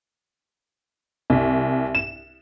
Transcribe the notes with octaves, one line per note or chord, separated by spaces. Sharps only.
C2
E7